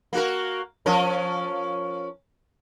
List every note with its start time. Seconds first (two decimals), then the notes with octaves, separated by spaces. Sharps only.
0.13 A#3 F#4 A#4
0.86 F3 C#4 A#4